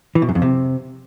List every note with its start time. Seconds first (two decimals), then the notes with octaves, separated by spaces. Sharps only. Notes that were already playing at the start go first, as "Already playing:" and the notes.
0.15 E3
0.22 B2
0.29 F#2
0.35 F2
0.42 C3